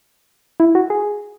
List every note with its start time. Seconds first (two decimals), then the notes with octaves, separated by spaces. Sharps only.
0.60 E4
0.75 F#4
0.90 G#4